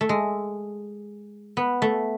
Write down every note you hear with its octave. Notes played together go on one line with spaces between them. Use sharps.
A3
G#3
B3
A3